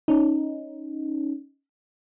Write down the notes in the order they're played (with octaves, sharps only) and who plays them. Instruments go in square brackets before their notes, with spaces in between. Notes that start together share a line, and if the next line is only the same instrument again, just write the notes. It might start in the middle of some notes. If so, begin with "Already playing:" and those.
[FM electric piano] C#4 D#4